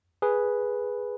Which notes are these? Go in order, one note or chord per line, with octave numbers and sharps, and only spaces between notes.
G#4 B4